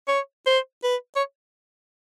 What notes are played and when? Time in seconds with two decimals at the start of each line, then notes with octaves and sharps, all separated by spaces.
0.08 C#5
0.47 C5
0.84 B4
1.16 C#5